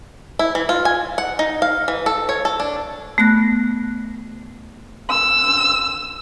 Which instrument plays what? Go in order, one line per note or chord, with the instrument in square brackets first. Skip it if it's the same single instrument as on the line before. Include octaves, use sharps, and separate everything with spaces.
[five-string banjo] E4
E3
F4
G#5
F#5
D#4
F5
E3
A4
C#5
A4
D4
[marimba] A3 B3 F#6 A#6
[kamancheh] E6